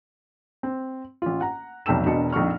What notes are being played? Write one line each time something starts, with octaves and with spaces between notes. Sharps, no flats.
C4
A1 F4
F#5 A#5
F1 B1 G5 A5 E6 E7
E1 B2 D4 D#5 C#7
A#1 F2 D#4 C#6 F6